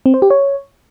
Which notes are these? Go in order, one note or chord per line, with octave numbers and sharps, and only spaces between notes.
C4
C5
G4
C#5